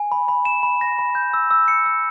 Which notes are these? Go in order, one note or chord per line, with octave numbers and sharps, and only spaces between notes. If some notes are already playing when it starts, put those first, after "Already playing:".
Already playing: G#5
B5
B5
E7
B5
A#6
B5
G6
E6
E6
C#7
E6